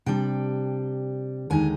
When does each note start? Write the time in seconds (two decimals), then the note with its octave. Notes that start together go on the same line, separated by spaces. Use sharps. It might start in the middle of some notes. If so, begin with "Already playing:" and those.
0.06 C3 G3 D4 G5
1.50 D#2 D3 G#3 D#4 G#5